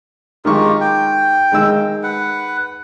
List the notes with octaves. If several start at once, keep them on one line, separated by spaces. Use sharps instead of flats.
D#3 G#3 F4 G4 A#4 C#6
G5
D#3 G#3 E6
B4 F#5